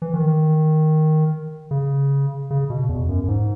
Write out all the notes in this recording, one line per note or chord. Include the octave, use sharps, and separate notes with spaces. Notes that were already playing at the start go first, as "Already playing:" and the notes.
E3
D#3
C#3
C#3
B2
E2
F#2
F#2
G#2